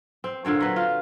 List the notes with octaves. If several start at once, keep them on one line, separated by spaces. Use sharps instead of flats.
C4
A#2 D3 C4 C#5
F#3 B4
F4